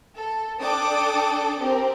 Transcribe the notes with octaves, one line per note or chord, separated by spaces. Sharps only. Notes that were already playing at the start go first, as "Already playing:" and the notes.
A4
D4 A4 D5 G5 D6 D#6
C4 G4 A#4